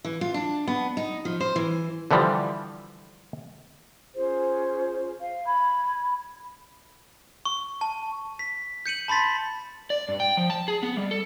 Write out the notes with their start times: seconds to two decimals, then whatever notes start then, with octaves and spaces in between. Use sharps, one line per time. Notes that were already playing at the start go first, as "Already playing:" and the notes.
0.05 E3
0.21 F4
0.34 D4
0.67 B3
0.97 D#4
1.25 F3
1.40 C5
1.56 E3
2.11 D3 E3 F3 G3
4.15 C#4 F4 G#4 C5
5.21 F5
5.47 B5 G#6
7.45 C#6
7.81 A5
8.39 B6
8.86 G6 C#7 D#7 F#7
9.08 A5 B5 C6 A6 B6
9.90 D5
10.08 G2
10.20 G5
10.37 F3
10.50 A5
10.68 G#4
10.83 B3
10.97 G3
11.11 A4